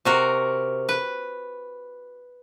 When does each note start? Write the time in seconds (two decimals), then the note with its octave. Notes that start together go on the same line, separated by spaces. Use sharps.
0.05 C3 F#4 A#4
0.89 B4